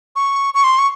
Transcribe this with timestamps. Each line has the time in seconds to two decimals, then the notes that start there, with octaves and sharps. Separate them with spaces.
0.16 C#6
0.54 C#6
0.64 C6
0.79 C#6